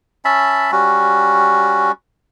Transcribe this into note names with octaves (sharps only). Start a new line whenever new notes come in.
C#4 E5 A5 B5
G3 C#4 F#4